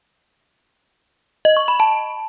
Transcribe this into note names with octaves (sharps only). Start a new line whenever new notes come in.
D#5
C#6
B5
A5